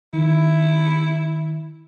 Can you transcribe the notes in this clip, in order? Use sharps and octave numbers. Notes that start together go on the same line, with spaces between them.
D#3 E4